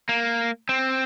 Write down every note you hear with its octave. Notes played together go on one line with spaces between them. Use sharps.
A#3
C4